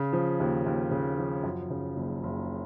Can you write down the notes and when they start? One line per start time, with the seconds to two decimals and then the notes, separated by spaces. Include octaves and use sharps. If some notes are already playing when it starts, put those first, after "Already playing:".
Already playing: C#3
0.13 F3
0.40 D#2
0.66 D#2
0.91 C#3
1.18 F3
1.44 F#2
1.70 C#3
1.96 F#1
2.23 F#1